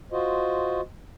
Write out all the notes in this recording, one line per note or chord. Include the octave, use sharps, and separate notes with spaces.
F4 F#4 C5 D#5